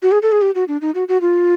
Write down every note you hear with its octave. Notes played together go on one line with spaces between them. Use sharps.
F#4
G#4
A4
G#4
G4
F#4
D4
D#4
F#4
F#4
F4